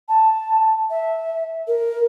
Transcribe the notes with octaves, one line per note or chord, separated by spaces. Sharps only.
A5
E5
A#4